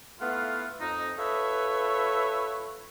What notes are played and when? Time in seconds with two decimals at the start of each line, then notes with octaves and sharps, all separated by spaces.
0.21 A3 B3 E4 F4 F5 F#5
0.80 F2 D#4
1.18 F4 A4 B4 C#5 E5